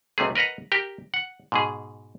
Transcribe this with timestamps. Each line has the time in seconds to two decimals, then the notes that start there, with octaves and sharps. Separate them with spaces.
0.18 B1 C3 A3 G#4
0.35 A#4 B4 D#5 F#5 A#5
0.72 G4 A#4 G5
1.14 F#5
1.52 G#2 B2 G#4